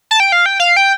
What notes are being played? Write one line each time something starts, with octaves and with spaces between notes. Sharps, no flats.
A5
G5
F5
G5
F5
G5